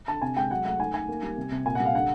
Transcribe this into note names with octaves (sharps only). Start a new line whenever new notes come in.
D3 A5
C3 G#5
G#3 G5
F#3 F#5
A3 F#5
D#3 G#5
D#3 G#5
A#3
G3
C3
C3
A#2 G#5
F#5
G3
F5
D3 F#5